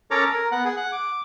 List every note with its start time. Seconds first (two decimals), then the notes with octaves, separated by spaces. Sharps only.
0.11 C#4 A4 A#4 C#5 A#5 D6
0.33 A#4
0.52 B3 F#5
0.65 G#4
0.76 F#5
0.92 D6